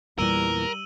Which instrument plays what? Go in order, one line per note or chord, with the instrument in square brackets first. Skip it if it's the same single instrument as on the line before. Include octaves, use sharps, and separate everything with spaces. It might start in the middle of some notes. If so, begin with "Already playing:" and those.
[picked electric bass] E2 A#2 E3 [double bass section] G3 [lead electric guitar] A#4 [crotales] E6 D#7 F#7